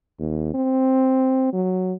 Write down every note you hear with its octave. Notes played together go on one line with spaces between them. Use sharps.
D#2
C4
F#3